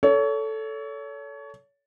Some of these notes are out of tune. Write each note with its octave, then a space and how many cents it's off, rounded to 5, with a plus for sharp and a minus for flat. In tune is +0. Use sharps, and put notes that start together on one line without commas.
A4 +0 C#5 +30